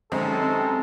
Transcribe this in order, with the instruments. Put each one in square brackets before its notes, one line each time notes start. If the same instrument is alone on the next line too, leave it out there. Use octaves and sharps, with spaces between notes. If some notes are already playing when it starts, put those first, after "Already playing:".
[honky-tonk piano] F#2 D#3 D#4 [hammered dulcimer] G#3 [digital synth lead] C4 [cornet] A4